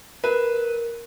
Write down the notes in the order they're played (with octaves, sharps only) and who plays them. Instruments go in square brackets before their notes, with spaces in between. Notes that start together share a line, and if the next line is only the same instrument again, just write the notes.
[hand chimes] A#4 [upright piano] B4